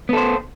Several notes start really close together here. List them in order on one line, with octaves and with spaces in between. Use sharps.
B3 A4 C5